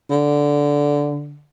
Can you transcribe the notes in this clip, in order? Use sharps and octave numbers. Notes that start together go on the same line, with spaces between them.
D3